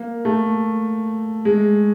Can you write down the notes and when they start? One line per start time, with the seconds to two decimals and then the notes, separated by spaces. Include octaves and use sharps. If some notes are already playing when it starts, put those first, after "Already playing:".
Already playing: A#3
0.25 A3
1.45 G#3